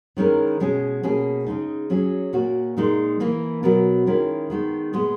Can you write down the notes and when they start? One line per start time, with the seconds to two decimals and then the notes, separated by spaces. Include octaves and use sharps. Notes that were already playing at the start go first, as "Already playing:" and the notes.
0.17 D#3 G#3 C#4 E4 A#4
0.60 B2 G#3 C#4 G#4
1.03 B2 A#3 C#4 G#4
1.46 C#3 G#3 D#4
1.90 F#3 C#4 G#4
2.33 A#2 A#3 C#4 F#4
2.77 A#2 G#3 D#4 A#4
3.20 E3 A#3 E4 A#4
3.63 B2 F#3 B3 F#4 A#4
4.06 D#3 G#3 C#4 E4 A#4
4.50 D#3 G#3 B3 D#4
4.93 A#2 G#3 B3